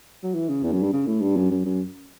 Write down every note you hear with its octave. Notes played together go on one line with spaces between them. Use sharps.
F#3
E3
C#3
E2
F#2
G2
C#3
A2
G2
F#2
F#2
F#2